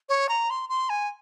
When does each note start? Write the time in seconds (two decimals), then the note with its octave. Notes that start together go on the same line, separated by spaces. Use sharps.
0.09 C#5
0.29 A#5
0.50 C6
0.69 C6
0.89 G#5